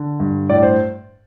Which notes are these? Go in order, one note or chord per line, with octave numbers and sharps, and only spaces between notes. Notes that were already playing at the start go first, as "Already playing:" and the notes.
Already playing: D3
G2
A2 D5
C5